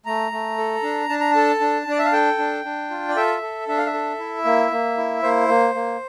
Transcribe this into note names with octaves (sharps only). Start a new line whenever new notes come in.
A3 A#5
A3
A4
D4
D4 A5
A#5
A4 A5
D4
D4 D5
E5
F5
A4 G5
D4
D4
F4
D5
A4 E5
A4
D4 E5
F5
E5
A4
E4
A#3
A#3
E4
A#3 C5
A#3
A#3